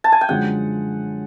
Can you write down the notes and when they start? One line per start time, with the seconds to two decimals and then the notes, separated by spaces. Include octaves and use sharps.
0.04 A5
0.12 G#5
0.21 G5
0.29 F#2 D3 F3 G#3 F#5